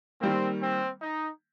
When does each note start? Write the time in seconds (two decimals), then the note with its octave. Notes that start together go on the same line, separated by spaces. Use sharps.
0.21 D#3 G3 A#3 C4
0.62 C4
1.02 D#4